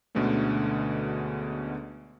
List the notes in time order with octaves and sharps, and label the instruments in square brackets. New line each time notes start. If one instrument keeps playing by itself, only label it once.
[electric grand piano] D2 B2 D3 G#3 A3 C#4